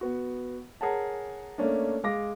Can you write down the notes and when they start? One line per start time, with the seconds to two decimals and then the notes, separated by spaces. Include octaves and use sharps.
0.01 B3 F#4
0.81 G#4 A#4 C#5 F#5 G#5 A5
1.58 A3 A#3 C#4 D4
2.04 G#3 F5 D6 A#6